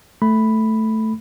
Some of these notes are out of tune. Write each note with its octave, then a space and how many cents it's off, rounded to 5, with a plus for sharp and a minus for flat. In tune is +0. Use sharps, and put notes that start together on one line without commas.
A3 +0 B5 +0